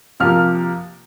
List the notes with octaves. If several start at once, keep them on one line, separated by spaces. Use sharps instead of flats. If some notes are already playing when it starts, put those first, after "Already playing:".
C3 F3 A#3 F6